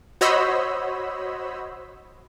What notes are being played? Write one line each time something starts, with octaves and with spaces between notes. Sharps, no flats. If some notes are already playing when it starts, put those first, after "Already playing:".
F#4 C5 C#5 D#5 B5 E6